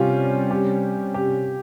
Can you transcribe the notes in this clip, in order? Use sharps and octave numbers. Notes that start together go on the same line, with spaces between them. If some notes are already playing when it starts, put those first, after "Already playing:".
Already playing: C3 G3 C#4 F4 G4
G4
G4